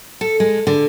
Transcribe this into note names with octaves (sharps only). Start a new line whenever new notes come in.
A4
G#3
D3